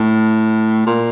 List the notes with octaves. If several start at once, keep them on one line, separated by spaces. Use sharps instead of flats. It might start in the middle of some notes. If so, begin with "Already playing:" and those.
Already playing: A2
A#2